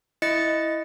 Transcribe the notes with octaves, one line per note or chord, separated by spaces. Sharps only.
E4 D#5 A6 C#7